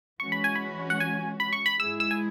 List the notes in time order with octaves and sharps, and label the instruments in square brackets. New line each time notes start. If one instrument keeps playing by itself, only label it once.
[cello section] E3 G#3 C#4 F#4 [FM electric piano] C#6
[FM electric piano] B5
G#5
B5
F#5
G#5
B5
C#6
B5
[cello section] G#2 G#3 E4 G#4 [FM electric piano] E6
[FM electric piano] E6
G#5